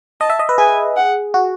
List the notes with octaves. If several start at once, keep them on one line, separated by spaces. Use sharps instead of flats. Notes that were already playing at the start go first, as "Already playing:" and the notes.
D#5 A5
E5
D#5
B4
G#4 G#5
F#5
F#4